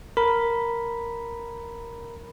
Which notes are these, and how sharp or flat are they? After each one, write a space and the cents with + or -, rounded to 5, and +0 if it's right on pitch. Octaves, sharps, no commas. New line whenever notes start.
A#4 +0 B5 +0